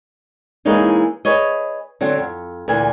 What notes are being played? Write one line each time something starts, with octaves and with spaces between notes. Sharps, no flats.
E3 G#3 A#3 C#4 D#4 E4
G#4 B4 C#5 D#5
D3 F#3 C4 D4
F2
D2 A#2 E3 G#5